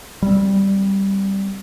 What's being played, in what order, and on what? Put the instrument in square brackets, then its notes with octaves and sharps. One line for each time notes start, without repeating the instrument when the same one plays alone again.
[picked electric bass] G3 C4